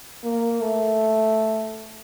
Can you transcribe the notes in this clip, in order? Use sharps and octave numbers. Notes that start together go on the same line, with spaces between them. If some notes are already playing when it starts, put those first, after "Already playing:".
A#3
A3